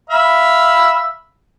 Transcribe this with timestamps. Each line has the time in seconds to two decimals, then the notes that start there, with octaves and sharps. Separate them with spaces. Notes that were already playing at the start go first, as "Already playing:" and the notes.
0.10 E5 F5 B5